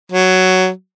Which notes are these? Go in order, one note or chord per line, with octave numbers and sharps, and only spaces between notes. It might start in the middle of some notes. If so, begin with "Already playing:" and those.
F#3